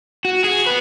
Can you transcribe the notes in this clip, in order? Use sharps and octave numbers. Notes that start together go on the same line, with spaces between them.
F#4
G#4
B3 B4